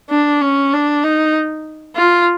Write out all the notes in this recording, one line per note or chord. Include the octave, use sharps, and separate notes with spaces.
D4
C#4
D4
D#4
F4